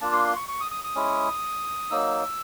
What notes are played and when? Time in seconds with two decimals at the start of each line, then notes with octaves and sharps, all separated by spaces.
0.01 A#3 D4 F4 A5
0.13 C6
0.25 C6
0.36 C#6
0.48 C#6
0.60 D#6
0.71 D#6
0.84 D#6
0.95 G#3 C#4 E4
1.91 F#3 A#3 D#4 E6